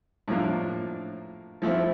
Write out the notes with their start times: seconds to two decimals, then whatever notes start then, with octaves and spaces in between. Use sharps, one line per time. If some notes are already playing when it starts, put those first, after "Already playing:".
0.28 A2 F3 A#3 D4
1.62 F3 A3 C4 E4